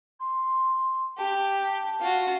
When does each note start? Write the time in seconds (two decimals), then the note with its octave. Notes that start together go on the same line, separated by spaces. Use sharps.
0.19 C6
1.18 G4 A5
2.00 F4 F#4